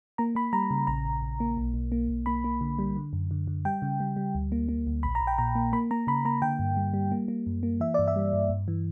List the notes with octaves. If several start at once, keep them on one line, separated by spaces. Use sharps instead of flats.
A#3 A#5
A#3 B5
G3 A#5
C#3
A#1 A#5
A#1
A#1
A#3
B1
B1
A#3
B1
A#3 B5
A#3
D3
G3
D3
F#2
D3
D3
G3 G5
C#3
G3
G3
D2
A#3
A#3
D2
A#1 B5
A#5
A#1
G5
A#2 A#5
A#3
A#3 B5
A#3 A#5
C#3 B5
A#3 A#5
D3 G5
G2
G3
G3
A#3
A#3
F#2
A#3
E3 E5
G2 D5
E5
G3
G2
G2
E3